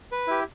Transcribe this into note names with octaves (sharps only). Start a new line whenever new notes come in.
B4
E4 G4